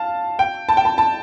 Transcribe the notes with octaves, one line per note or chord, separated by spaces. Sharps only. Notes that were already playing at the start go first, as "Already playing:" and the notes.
Already playing: F5 A5
G5
A5
G5
A5
A5